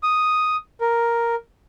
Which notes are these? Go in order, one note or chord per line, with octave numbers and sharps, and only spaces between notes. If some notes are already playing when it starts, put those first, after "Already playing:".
D#6
A#4